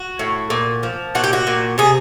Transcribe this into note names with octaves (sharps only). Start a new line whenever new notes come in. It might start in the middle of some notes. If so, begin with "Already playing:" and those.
Already playing: F#4
A2
A#2
F3
A#2 F#4
G4
F#4
A#2
C3 G#4